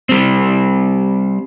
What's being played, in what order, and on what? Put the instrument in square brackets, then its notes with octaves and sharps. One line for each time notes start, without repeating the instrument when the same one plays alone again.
[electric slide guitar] G3 C4